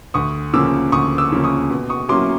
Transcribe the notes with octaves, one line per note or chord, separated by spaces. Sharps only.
D2 C#6 D#6
C#3 F3 A#3 D6 E6
D2 C#6 D#6
D6 E6
C#3 F3 A#3
C#6 D#6
B2
C#6 D#6
F#3 A#3 C#4 E4 C6 D6